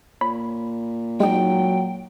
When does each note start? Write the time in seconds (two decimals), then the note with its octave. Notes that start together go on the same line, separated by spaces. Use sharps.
0.21 A#2 C#5 B5
1.20 F#3 G#3 D#4 G5